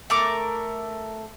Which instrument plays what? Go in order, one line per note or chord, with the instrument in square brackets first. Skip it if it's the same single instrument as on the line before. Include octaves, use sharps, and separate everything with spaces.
[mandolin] A3 A#4 D6